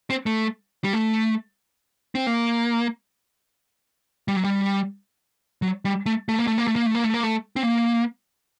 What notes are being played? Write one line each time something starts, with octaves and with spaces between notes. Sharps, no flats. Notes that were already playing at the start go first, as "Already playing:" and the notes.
C4
A3
G3
A3
C4
A#3
G3
F#3
G3
F#3
G3
A3
A3
A#3
A3
A#3
A3
A#3
A3
A#3
A3
A#3
A3
C4
A#3